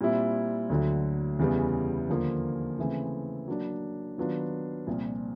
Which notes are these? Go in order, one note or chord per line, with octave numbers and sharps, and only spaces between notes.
A#2 G3 C4 E4
D2 D3 F#3
E2 C#3 E3 G3 B3
D#2 D3 F3 A#3
C#3 E3 A3 C4
F#3 A#3 D4
D#3 F#3 B3 D4 F4
C2 A#2 F3